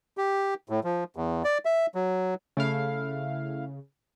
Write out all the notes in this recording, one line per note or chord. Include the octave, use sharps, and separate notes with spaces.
G4
A2
F3
E2
D5
E5
F#3
C#3 A3 E4 F5